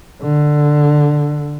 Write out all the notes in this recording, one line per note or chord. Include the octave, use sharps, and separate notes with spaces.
D3